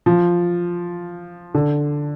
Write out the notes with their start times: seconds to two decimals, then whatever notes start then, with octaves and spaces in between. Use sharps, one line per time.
0.06 F3
1.54 D3